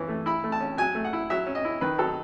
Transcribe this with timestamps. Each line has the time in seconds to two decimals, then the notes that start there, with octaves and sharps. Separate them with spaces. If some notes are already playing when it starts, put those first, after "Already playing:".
Already playing: E3 C#4
0.08 A3
0.26 E4 B5
0.44 A3
0.52 A5
0.60 C#4
0.77 F#3 G#5
0.95 A3
1.04 F#5
1.13 E4
1.30 F#3 E5
1.46 C#4
1.55 D#5
1.65 E4
1.81 D#3 B4
1.98 F#3 A4